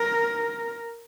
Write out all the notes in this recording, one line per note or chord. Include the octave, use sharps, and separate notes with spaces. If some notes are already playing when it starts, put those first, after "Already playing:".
Already playing: A#4